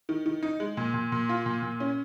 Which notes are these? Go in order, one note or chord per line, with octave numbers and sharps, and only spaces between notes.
D#3
D#3
D#4
G#3
A#2
A#2
A#2
F4
A#2
A#2
C#4